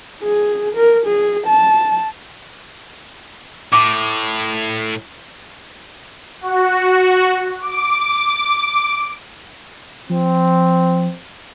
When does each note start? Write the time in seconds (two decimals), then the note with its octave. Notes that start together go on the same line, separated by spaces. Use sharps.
0.23 G#4
0.76 A#4
1.06 G#4
1.47 A5
3.73 A2 D6
6.41 F#4
7.61 D6
10.10 F3 C4